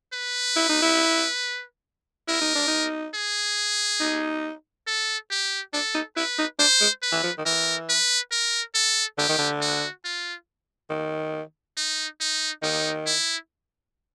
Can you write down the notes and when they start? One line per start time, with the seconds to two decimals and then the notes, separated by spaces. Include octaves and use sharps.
0.13 B4
0.56 E4
0.69 D#4
0.82 E4
2.28 E4 A#4
2.41 D#4
2.55 D4
2.67 D#4
3.14 G#4
4.00 D#4
4.87 A4
5.31 G4
5.73 D4 A4
5.95 D#4
6.16 E4 B4
6.38 D#4
6.59 D4 C5
6.81 G#3
7.02 B4
7.12 E3
7.24 F3
7.38 D#3
7.45 E3 A#4
7.89 B4
8.32 A#4
8.75 A4
9.18 D3 G4
9.29 D#3
9.38 D3
9.61 F#4
10.04 F4
10.90 D#3
11.77 D#4
12.20 D#4
12.62 D#3 D#4
13.06 E4